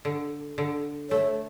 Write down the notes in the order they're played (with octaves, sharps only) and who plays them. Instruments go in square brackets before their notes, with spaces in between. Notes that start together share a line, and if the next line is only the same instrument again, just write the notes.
[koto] D3
D3
[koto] A3 [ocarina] C#5